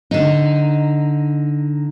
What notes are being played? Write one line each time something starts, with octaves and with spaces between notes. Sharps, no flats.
D3 D#4